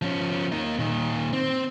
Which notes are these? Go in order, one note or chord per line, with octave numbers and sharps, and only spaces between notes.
F3 C#4
A#3 D#4
A#2 D#3
C4